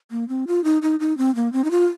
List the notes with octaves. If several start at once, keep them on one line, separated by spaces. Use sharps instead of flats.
A#3
C4
F4
D#4
D#4
D#4
C4
A#3
C4
D#4
F4